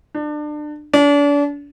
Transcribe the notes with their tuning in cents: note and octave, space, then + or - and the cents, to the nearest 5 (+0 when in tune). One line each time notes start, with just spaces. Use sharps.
D4 +30
D4 -35